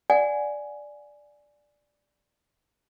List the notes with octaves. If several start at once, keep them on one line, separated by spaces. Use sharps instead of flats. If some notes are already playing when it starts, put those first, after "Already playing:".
D5 F#5 G#5